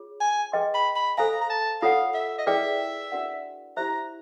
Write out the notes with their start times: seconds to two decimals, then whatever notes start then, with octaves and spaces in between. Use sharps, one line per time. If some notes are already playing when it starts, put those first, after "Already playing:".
Already playing: F4 G#4 C#5
0.20 G#5
0.52 G#4 B4 D#5 G5 C6
0.74 B5
0.96 B5
1.18 A4 C5 F5 G#5 A#5
1.41 A#5
1.49 A5
1.82 F4 A4 C#5 F5 F#5
2.14 E5
2.38 D#5
2.47 E4 G#4 B4 D5 E5 G5
3.12 D4 F#4 A#4 D5 F#5
3.77 E4 G4 C5 E5 A#5